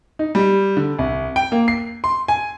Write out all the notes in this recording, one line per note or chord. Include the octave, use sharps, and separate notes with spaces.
D#4
G3
D3
C2
G5
A#3
C7
C6
G#5